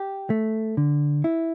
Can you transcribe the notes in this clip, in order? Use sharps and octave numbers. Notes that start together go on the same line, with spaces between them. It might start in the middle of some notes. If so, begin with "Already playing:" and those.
Already playing: G4
A3
D3
E4